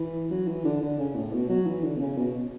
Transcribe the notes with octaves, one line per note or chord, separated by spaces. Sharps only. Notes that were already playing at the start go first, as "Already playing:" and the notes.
Already playing: E3
F#3
E3
D3
D3
C#3
A2
B2
F#3
E3
D3
B2
C#3
B2